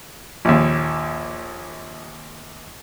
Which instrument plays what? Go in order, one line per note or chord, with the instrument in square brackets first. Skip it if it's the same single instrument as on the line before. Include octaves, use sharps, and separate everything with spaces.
[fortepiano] A#1 D#2